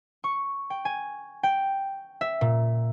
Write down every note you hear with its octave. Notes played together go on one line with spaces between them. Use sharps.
C#6
G5
G#5
G5
E5
A#2